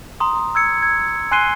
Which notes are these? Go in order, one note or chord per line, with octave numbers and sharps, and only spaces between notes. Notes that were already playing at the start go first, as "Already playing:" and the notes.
A#5 C6 D#6
E6 G#6 C#7
G#6
G#5 C6 F#6 C7 D#7 G7